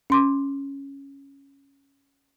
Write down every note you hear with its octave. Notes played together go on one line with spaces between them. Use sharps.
C#4 C6 D6